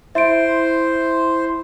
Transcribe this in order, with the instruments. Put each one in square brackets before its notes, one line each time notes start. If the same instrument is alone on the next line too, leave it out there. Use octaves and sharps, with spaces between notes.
[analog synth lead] E4 [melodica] C5 [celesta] E5 D7